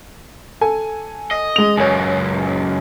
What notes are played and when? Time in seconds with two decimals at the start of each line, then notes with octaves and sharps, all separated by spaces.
0.61 A4 G#5
1.31 D#5
1.56 G#3 F7
1.77 C#2 F#2 C#5 G#5